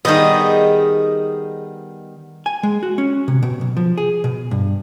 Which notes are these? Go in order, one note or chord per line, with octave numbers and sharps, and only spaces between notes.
D#3 G3 B3 G#4 D#5
G#5
G#3
F#4
C#4
C3
B2
B1
F3
G#4
B2
G2